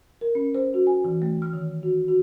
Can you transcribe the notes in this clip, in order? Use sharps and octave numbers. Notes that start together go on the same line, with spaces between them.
A#4
C#4
C5
F#4
G#5
E3
A3
F6
D#3
F#4
F#4